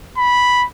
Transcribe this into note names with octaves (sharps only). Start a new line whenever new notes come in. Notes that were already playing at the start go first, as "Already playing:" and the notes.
B5